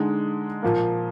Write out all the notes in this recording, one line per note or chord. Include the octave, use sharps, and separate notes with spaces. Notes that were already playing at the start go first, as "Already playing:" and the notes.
Already playing: D3 G#3 D#4
A#2 F3 A#3